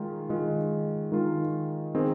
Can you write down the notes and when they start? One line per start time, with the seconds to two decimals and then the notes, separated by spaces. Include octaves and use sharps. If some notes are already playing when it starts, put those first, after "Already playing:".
Already playing: D#3 G#3 F4
0.29 D#3 G#3 F4
1.12 D#3 G#3 F4
1.95 D#3 C4 G#4